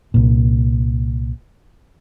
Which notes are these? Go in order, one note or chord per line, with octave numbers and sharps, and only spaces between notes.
C2 A#2